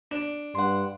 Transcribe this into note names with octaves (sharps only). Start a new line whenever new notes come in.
D4
G2 F#5 C6